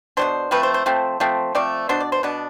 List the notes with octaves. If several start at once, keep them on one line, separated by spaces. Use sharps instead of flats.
B2 G3 D4 C5
F3 A3 C4 B4
C5
C5
F3 A3 C4
F3 A3 C4
F3 A3 C4 D5
B2 B3 D4 C5
D5
C5
B2 B3 D4